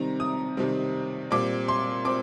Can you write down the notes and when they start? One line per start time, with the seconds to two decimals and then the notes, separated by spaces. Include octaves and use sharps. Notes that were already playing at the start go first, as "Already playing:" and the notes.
Already playing: C3 D#3 G3 C4 A#5
0.20 D#6
0.57 C3 D#3 G3 C4
1.31 A#2 G3 C4 D6
1.68 C6
2.05 C4 D6